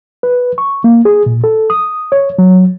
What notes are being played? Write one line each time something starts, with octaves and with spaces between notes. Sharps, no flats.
B4
C#6
A#3
G#4
A#2
A4
D#6
C#5
F#3